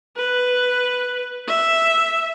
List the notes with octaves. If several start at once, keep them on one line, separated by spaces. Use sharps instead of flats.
B4
E5